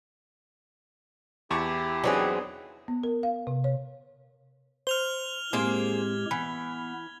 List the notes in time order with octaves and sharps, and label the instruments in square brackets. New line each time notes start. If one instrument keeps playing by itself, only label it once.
[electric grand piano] E2 [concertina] E4 G4 [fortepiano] A5 C#6 D6
[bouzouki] F#3 C4 G#4 [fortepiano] B3 D4 D#4
[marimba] B3
A#4
F5
C3
C#5
[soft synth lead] C5 [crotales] F6 F7 G7
[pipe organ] A2 G#3 G4 [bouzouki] A#3 G#4 C5 [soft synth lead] C4 [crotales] G#6
[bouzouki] E3 [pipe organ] B3 [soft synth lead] B5